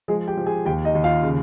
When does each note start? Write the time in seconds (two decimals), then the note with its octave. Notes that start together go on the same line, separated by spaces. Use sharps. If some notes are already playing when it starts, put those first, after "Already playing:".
0.08 F3 G#3 G#4
0.28 G4 G5
0.37 F3
0.46 G#4 G#5
0.65 D#2 G4 G5
0.85 D#4 D#5
0.95 D#2
1.04 F4 F5
1.23 C#3